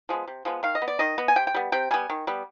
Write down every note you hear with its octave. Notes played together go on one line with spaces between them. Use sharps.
F3 G#3 B3
C3
F3 G#3 B3
D#3 F5
D#5
B3
D5
D#3 D#5
B3
G#5
C3 G5
G5
G3 B3
C3 G5
G3 B3 G#5
D#3
G3 B3